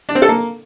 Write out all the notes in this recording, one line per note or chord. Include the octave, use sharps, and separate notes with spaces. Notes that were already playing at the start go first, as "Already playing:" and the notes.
D4
C4
A4
A#3